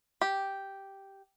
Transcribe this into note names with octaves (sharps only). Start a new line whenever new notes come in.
G4